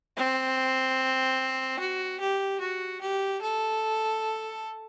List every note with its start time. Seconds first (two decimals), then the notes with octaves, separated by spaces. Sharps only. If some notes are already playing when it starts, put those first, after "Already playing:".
0.17 C4
1.80 F#4
2.20 G4
2.61 F#4
3.01 G4
3.42 A4